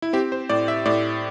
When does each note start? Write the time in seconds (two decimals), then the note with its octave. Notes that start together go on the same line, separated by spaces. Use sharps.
0.02 E4
0.13 C4 G4
0.32 C5
0.49 A2 D5
0.68 E5
0.86 A2 D5